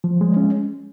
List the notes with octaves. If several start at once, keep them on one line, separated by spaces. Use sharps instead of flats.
F3
G#3
C#4